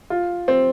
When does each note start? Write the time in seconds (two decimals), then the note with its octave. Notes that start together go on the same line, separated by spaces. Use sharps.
0.10 F4
0.48 C4